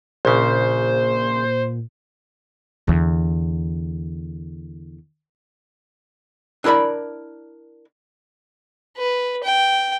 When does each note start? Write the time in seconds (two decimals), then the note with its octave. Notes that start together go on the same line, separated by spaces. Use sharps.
0.25 A#1 A#2 C#3 C5
2.87 E2 D3
6.64 D4 E4 A#4 D5 B5
8.97 B4
9.44 G5